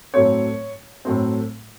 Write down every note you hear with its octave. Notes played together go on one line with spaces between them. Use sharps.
A2 F#3 A3 C4 C#5
A2 F#3 A3 C4